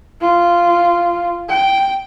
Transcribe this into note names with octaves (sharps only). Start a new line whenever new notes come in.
F4
G5